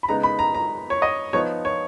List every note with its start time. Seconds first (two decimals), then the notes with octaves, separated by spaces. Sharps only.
0.03 B5
0.08 C#3 G#3 B3 D#4 A#5
0.23 B5
0.39 A#5
0.54 A#5
0.90 C#5
1.02 D#5
1.33 F3 B3 D#4 C#5
1.65 C#5